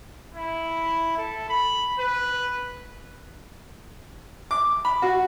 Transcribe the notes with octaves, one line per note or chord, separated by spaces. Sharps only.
E4
A4
B5
B4
D6
B5
F#4